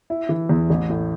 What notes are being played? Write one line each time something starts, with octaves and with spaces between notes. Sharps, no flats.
E4
E3
E2
A1
A2